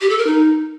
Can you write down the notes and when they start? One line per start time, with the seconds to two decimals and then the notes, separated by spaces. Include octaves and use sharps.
0.01 G4
0.09 A4
0.18 A#4
0.27 D#4